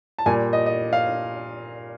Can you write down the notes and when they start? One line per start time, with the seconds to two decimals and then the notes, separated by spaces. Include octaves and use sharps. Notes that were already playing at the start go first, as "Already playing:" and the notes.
0.18 A5
0.26 A#2 G3 G#5
0.53 D#5
0.66 D#5
0.93 F5